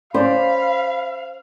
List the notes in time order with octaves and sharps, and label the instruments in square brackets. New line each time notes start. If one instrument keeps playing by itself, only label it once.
[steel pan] C#4 D5 [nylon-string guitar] C5 [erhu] F5 [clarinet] B5